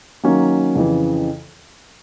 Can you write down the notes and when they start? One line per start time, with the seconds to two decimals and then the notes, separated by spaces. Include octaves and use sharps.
0.23 D#3 F#3 A#3 C#4
0.76 F2 C#3 E3